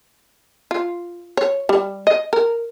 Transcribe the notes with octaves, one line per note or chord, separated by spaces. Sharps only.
F4
C#5
G3
D#5
A#4